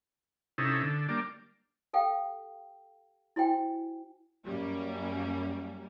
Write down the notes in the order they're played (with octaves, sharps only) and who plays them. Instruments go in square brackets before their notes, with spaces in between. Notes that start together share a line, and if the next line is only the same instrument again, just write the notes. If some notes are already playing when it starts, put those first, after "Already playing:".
[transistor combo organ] C3 C#4 D#4 E4 A4
D3 A4
G3 A#3 D4 D5
[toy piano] G4 A4 F5 G5
E4 F#4 C5 G5 G#5
[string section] F#2 G3 A#3 C#4